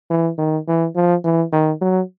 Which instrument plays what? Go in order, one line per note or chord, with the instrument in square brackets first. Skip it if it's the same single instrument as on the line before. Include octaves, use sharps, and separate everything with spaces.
[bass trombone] E3
D#3
E3
F3
E3
D#3
F#3